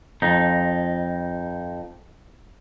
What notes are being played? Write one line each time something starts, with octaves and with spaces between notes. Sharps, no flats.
F2 D#4